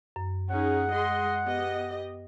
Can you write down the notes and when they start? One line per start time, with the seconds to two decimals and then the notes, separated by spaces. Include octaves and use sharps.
0.16 F#2
0.50 C#4 D#4 G#4 F#5
0.91 G#3 D#5 C6
1.45 B3 G4 D#5